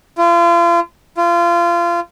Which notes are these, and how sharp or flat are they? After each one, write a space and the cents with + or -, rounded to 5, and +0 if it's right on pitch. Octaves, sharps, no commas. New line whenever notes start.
F4 -35
F4 -25